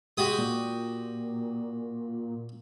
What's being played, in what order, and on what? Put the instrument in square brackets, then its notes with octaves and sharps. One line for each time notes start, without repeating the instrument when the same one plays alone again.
[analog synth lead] G#3 [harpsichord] F#4 G4 D#6
[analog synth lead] A#2